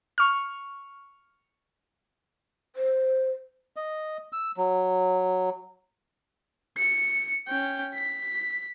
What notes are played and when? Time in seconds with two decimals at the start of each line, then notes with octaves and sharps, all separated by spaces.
0.18 C#6 F6
2.76 C5
3.76 D#5
4.33 E6
4.57 F#3
6.77 C#7
7.48 C#4 G5
7.94 B6